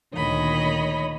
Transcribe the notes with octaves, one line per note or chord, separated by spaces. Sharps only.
D2 A#2 D#3 C#5 D#5 B5